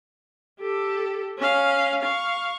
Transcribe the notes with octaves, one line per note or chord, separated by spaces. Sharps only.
G4 A4
C#4 F5
F5 C#6